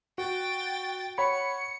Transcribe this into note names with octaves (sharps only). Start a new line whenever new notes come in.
F#4 G5 A6
C#5 F#5 B5 C#7